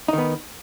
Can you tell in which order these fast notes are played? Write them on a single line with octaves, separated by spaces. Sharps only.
D#4 D#3 B3